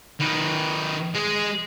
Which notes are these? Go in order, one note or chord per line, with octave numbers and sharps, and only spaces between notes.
D#3 B4
G#3 G#4